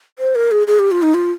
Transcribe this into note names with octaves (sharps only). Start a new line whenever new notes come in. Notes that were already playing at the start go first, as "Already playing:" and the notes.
C5
A#4
G#4
G#4
G4
F4
D#4
F4